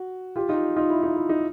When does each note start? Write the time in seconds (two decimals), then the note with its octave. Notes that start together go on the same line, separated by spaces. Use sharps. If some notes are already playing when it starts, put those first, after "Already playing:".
Already playing: F#4
0.36 F4 G4
0.49 D#4 F4
0.76 D#4 F4
0.90 E4
1.03 D#4
1.16 E4
1.29 D#4